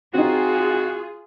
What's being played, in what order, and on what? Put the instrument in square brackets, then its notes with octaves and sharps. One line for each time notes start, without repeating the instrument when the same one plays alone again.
[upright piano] C4 D#4 [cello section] F4 G#4 [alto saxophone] F#4